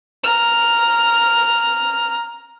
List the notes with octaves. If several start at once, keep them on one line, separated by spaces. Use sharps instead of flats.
A#5 F6